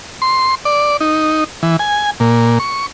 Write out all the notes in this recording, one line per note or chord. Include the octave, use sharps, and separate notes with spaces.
C6
D5
D#4
E3
G#5
A#2
C#6